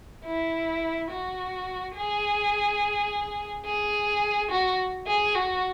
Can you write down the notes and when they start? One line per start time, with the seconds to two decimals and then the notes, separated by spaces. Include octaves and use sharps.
0.25 E4
1.10 F#4
1.96 G#4
3.66 G#4
4.51 F#4
5.07 G#4
5.35 F#4